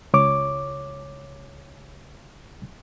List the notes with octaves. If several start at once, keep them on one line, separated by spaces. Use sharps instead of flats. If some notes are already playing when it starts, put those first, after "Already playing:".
C#2 C#5 D6